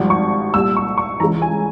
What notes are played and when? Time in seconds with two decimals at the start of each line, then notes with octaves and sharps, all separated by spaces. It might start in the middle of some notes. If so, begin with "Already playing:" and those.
Already playing: G#1 G2 F3
0.10 C#6
0.54 C2 A#2 G3 E6
0.77 C#6
0.98 C#6
1.20 E3 A#5
1.23 C#2 C#3
1.42 G#5